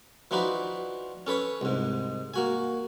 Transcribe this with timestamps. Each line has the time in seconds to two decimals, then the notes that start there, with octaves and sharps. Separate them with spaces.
0.31 E3 F3 D4 D#4 F#4 B4
1.27 C#4 A4 B4 C#5
1.61 C2 G#2
2.34 A#3 F#4 G#5